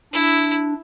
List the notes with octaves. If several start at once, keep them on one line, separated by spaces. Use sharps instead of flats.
D4 E4